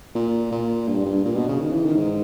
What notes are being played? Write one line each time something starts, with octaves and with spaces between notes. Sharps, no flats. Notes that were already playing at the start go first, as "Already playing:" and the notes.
A#2
A#2
G2
G2
A#2
B2
C#3
D#3
E3
D#3
G#2